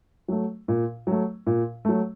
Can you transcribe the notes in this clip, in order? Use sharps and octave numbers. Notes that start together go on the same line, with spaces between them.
F#3 A3
A#2
F#3 A3
A#2
F#3 A3